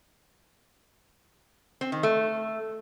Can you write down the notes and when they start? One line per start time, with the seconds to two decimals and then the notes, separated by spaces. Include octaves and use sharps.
1.81 C4
1.92 D#3
2.03 A3